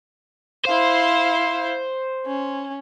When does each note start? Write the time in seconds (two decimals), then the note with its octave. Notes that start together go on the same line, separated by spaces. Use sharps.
0.65 E4 C5 F5
2.26 C#4